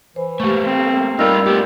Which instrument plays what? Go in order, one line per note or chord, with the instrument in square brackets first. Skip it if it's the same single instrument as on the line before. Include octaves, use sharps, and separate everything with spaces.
[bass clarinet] E3 [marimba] C5
[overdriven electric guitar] A3 A#3 [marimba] G4 C#6
[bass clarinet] C4
[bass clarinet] G3 [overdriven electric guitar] D#4 F4 [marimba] A#4 E6 F6
[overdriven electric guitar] A3 B3 [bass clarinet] G4